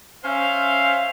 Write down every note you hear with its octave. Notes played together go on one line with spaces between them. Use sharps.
C#4 C5 E5 F5